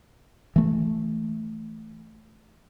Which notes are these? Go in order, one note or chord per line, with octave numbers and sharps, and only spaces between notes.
E3 A3